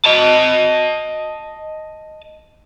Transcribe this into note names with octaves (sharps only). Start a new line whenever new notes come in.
D#5 A5